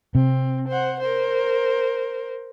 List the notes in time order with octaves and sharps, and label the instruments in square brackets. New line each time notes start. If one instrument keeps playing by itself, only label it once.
[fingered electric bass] C3 [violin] C4
[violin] C5 F#5
A#4 C5